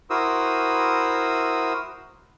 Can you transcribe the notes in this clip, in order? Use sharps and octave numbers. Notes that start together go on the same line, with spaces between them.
E4 F#4 A#4 C5 D#6 E6